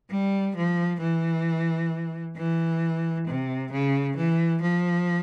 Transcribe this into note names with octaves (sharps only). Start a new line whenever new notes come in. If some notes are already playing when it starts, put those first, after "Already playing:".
G3
F3
E3
E3
C3
C#3
E3
F3